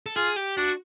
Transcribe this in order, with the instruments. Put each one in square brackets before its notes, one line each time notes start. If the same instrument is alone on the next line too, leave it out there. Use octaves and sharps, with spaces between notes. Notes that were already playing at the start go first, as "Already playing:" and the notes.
[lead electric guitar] A4
[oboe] F4 [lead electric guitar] G#4
[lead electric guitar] G4
[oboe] D4 [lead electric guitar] F#4